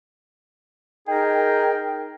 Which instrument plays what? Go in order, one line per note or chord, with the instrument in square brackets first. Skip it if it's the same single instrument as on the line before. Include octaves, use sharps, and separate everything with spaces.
[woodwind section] D#4 G#4 A#4 [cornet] G5